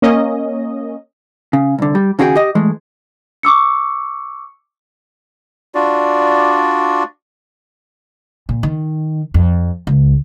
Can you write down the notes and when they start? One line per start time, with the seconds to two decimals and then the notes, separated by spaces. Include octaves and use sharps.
0.02 A#3 C#4 D#5
1.53 C#3
1.79 C2 D3
1.95 G3
2.19 D#2 C#3 F#4 G#4 A#4 G5
2.36 G4 D#5
2.55 E3 G#3 A3
3.43 C#6 D6 E6 C#7
5.75 D4 F4 F#4 D5
8.49 A#2
8.63 D#3
9.34 F2
9.87 C#2